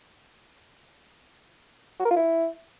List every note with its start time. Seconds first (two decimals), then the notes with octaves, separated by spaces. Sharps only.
2.00 F#4
2.05 A#4
2.11 F4
2.16 E4